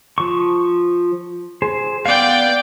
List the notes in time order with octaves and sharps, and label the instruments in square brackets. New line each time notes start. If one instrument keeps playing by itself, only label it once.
[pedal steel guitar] F3 C#6
G#4 C5
[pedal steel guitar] B3 F5 [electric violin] D5 G5